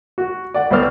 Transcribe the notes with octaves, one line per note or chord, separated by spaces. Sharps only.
F#4
D5 F#5
C2 B3 C5 D5 F6